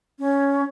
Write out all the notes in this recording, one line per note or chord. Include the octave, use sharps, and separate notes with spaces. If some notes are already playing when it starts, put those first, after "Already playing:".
C#4